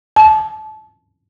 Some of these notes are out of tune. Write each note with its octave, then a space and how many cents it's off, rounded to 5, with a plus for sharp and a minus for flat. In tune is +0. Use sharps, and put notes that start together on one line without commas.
A5 -25